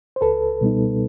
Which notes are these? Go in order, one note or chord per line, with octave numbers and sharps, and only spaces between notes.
C5
C#2 A4 B4
B2 G3 B3 D#4